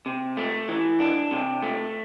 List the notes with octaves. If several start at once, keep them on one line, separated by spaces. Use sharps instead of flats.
C3
A3
E3
D4
C3
A3